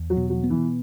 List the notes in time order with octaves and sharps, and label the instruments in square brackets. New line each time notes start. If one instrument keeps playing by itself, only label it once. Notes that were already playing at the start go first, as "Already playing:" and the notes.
Already playing: [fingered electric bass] E2
[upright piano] F#3
[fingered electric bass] B2
[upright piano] F#3
[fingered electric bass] B3
[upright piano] E3